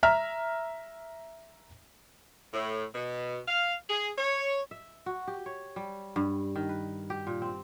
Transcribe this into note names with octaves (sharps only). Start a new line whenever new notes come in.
E5 A#5 F6
A2
B2
F5
G#4
C#5
E5
F#4
G4
C#5
G3
G2
D#3
B4
G4
A#2
C4